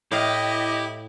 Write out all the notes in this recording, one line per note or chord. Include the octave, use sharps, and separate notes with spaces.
A2 E4 G4 D#5 F5